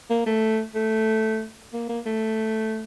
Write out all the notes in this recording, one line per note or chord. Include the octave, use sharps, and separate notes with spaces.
A#3
A3
A3
A#3
A#3
A3